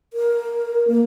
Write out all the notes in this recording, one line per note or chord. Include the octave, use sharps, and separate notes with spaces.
A#4
A#3